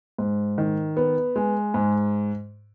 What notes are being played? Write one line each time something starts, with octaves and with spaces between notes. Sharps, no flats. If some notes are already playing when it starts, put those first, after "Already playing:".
G#2
D#3
B3
G#3
G#2